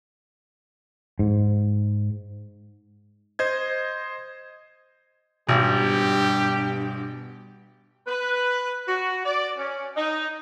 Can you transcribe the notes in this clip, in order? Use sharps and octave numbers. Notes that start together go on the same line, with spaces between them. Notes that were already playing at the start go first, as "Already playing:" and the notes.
G#2
C5 D#5 G#6
G#1 G2 B2 G4
B4
F#4
D5
C#4
D#4